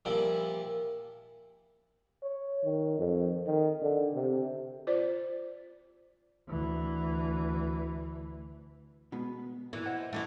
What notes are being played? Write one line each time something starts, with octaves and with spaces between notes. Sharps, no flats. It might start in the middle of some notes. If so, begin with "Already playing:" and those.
A#2 F3 G3 E4
C#5
D#3
F2
D#3
D3
C3
F4 C5 D5
D2 E3
B2 G#3 B3
A#2 E3
C5 D#5 F#5
E3 G3 A3